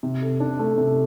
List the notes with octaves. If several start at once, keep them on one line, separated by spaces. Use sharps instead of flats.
C3
A4
D4
A3
C3